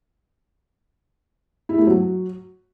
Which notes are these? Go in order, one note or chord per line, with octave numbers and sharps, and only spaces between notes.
E4
A3
F#3